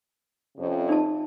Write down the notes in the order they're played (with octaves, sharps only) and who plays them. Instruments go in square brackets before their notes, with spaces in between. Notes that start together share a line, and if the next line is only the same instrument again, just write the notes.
[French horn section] F2 C3 C#4
[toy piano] D#4 A5